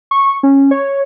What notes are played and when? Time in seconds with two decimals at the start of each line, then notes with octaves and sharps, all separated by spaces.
0.11 C#6
0.43 C#4
0.71 C#5